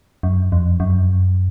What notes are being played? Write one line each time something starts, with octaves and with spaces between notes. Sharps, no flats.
F#2
F2
F#2